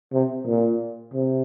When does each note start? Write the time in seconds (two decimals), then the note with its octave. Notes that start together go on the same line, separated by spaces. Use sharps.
0.13 C3
0.46 A#2
1.14 C3